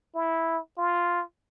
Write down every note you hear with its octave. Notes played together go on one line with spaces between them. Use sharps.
E4
F4